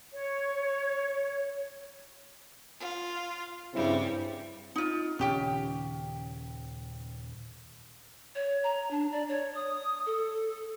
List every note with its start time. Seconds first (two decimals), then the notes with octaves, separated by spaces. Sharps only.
0.13 C#5
2.80 F4
3.74 G2 C#3 G3 C4 E4
4.76 D#4 F4
5.19 D#1 C#3 C#4 G4 G5
8.35 C#5
8.64 A#5
8.91 D4
9.12 D5
9.29 C#5
9.55 D#6
10.06 A4